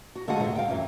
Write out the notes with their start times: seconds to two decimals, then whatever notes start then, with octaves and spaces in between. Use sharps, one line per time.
0.15 F#4
0.28 D3 G#3 F4 F#4 G#4 F#5
0.40 D2 C3
0.55 F5 G5
0.68 F#2 E3 C#4